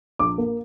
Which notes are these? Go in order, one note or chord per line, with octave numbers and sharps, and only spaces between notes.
A#1 D6
A#3